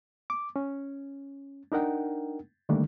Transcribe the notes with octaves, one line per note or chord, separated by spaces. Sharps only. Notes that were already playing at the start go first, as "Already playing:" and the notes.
D6
C#4
D4 D#4 A#4 F#5 G5
D3 D#3 G3 A3 A#3 D4